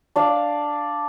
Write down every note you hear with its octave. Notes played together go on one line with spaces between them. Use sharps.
D4 D5 F5